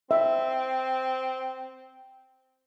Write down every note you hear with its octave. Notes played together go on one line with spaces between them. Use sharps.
C4 E5